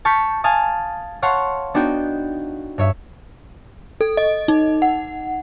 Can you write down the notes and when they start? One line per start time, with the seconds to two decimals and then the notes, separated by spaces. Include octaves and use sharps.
0.05 A5 C#6 F6 G6 B6
0.44 F5 G#5 A5 D#6
1.22 C#5 F5 F#5 A5 C6 C#6
1.74 B3 D4 D#4 F#4 G5
2.78 G2 C#5 E5
4.01 A4
4.17 D#5
4.48 D#4
4.82 F#5